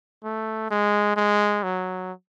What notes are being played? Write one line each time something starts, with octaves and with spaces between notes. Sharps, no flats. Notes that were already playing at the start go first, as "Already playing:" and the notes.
A3
G#3
G#3
F#3